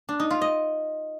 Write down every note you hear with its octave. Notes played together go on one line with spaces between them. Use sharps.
D4
D#4
F4
D#5